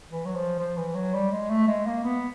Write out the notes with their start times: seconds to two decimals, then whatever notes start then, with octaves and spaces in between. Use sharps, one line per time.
0.11 E3
0.25 F#3
0.35 F3
0.59 F3
0.77 E3
0.95 F#3
1.14 G3
1.31 G#3
1.50 A3
1.67 G#3
1.86 A#3
2.04 B3